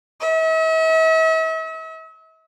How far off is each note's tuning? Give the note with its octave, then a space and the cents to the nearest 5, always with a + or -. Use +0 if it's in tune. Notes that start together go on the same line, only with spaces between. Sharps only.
E5 -45